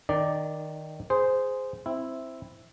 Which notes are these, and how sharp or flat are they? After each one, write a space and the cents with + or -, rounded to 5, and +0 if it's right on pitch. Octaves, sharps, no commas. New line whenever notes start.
D#3 +0 D#4 -35 D5 +0
G#4 +0 C5 -15
C4 +0 E4 +0